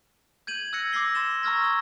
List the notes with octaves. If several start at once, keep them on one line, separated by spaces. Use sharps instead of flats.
G6 G#6 D#7 F#7
E6 F#6 G#6 A#6 C#7
D6 E6 A#6 C7 G7
C6 A6 E7 G7
A#5 C#6 E6 F6 G#6 A#6
D#6 G7